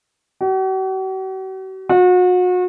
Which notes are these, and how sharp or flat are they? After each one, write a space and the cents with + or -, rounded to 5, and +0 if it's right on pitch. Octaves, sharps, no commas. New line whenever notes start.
F#4 +45
F#4 -35